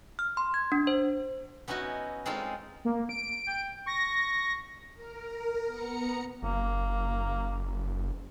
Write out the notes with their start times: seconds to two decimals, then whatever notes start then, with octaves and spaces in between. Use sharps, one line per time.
0.19 F6
0.37 C6
0.54 G#6
0.72 D4
0.87 C5
1.68 B3 C#4 D#4 E4 F#4
2.26 G#3 C4 C#4 D#4 F4 A4
2.85 A#3
3.09 D7
3.47 G5
3.87 C#6 A#6
4.94 A#4
5.66 B3 A#5 C#7
6.42 F#1 A#3